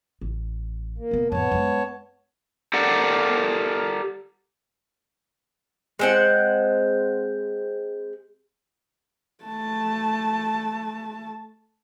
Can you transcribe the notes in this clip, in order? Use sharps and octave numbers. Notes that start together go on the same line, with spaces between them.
A1
A#3
E1 B3
F2 A2 B3 C#5 A5
F#2 G#3
G4 A4 A#4 D5 F#5
G#3 C4 F#5
A3 A5